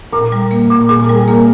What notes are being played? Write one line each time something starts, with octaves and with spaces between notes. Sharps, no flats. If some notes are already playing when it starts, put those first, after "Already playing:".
A#2 A#4
G3
A#3
A#2
A#2 G#4
A#4
G3
G#4
A#3 A#4